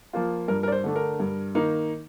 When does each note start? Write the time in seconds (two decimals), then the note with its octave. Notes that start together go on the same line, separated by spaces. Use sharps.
0.13 F3 A#3 F4
0.48 G2 A#4
0.63 A#4
0.68 D5
0.72 C5
0.84 D3 A3 D4
0.96 A#4
1.20 G2
1.55 D#3 A#3 D#4